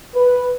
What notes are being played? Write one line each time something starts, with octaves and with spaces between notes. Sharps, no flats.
B4